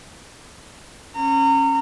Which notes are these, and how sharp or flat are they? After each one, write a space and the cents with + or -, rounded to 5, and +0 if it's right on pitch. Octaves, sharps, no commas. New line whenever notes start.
C#4 -20 A#5 -30